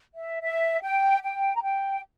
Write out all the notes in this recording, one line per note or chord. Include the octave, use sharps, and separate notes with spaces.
E5
E5
G5
G5
A#5
G5